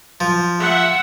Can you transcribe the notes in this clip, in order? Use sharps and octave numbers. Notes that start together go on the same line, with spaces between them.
F3
E5 F#5